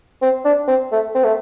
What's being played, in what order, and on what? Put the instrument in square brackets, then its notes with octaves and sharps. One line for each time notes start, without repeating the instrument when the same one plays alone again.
[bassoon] C4
D4
C4
A3
C4
A3